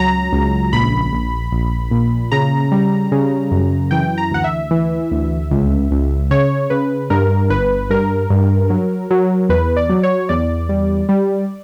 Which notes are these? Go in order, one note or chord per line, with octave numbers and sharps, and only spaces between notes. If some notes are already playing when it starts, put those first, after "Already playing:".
Already playing: C#2 F#3 A#5
C#2
A#1 B5
A#1
A#1
A#2
C#3 A#5
G3
C#3
F#2
E3 G5
A#5
D2 F#5
E5
E3
D2
C#2
C#2
C#3 C#5
C#3 B4
G2 A#4
G1 B4
G2 A#4
G2
F#3
F#3
E2 B4
D5
F#3
C#5
E2 D5
G3
G3